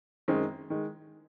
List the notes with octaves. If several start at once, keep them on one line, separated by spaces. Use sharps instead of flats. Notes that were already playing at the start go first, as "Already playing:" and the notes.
F#2 D#3 G#3 C4 D#4
D#3 G#3